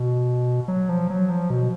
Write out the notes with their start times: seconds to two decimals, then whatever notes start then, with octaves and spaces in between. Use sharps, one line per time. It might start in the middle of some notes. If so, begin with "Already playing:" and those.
Already playing: B2
0.68 F#3
0.89 F3
1.10 F#3
1.30 F3
1.50 B2